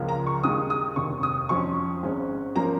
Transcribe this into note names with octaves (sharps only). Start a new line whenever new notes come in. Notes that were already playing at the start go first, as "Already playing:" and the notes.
Already playing: C#2 C#3 F3 A#3
A#5
C#6
D#2 D#3 G#3 D#6
D#6
F1 D#2 D#3 C#6
D#6
F2 F3 C#4 C#6
G#1 G#2 G#3 C#4
F3 A#3 C#4 A#5